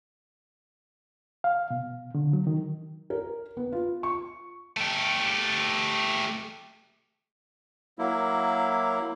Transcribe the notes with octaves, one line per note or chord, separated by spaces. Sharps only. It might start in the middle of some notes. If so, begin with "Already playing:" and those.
F5
B2
D3
F#3
D#3
A#4
B3
F4
C#6
A3 G4
F#3 A#3 E4